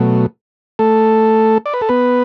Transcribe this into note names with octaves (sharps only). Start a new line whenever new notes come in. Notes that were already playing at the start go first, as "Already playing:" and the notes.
Already playing: B2 F#3 A3
A3 A4
D5
B4
A4
B3 B4